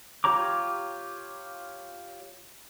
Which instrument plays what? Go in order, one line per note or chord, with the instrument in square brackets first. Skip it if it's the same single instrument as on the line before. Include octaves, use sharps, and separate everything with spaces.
[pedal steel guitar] F4 G4 C#5 A#5 D6